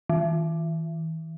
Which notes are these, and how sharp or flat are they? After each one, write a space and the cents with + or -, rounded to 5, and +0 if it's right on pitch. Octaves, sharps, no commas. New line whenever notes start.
E3 -40